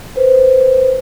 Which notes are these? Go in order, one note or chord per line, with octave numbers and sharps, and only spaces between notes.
B4 C5